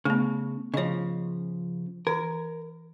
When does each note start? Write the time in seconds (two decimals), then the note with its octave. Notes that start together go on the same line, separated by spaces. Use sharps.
0.05 C#3 A3 B3
0.74 C#3 F3 C#5 D#5
2.07 E3 A#4